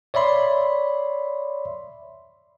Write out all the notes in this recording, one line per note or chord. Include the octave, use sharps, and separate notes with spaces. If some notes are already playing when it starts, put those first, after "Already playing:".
C#5 D5 E5 B5 C6